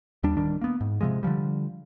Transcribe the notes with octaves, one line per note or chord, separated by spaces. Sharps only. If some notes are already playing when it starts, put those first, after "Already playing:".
D#2 G3 D4
D1 D#3 G3 D4
A#3 B3
G#2
C3 E3 F3 G#3
D3 D#3 F3 G3